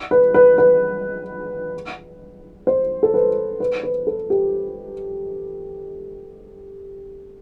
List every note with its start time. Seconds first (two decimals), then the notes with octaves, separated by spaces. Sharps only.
0.11 B4
0.34 B4
0.58 B4
2.67 C5
3.03 A4
3.14 B4
3.60 B4
3.83 B4
4.07 A4
4.30 G4